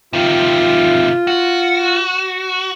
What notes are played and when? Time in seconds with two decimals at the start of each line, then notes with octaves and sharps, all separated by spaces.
0.13 C3 D#3 F4
1.27 F#4